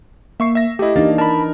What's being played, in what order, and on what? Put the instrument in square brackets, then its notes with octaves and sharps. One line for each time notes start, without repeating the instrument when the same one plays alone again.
[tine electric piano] A#3 [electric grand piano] E5 C#6 C7
[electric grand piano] E5 A#6
[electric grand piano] A3 E4 [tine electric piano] G4 D#5
[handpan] E3 D4 D#4 [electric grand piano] A#3 F5 A6
[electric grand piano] A#4 [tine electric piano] A5 B5